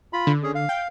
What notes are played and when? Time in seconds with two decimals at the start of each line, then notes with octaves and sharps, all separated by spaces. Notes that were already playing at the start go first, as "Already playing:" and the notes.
0.13 F4 B5
0.27 D3
0.43 C#4 G#4
0.55 F5
0.69 G5